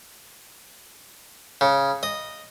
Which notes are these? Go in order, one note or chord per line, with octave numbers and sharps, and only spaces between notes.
C#3
D#5